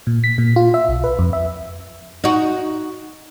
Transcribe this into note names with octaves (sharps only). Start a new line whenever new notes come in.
A#2
B6
A#2
F4
E5
B1
B4
F2
E5
D#4 F#4